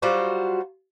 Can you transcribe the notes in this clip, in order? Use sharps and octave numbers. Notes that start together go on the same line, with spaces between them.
F#3 G3 F4 F#4 C5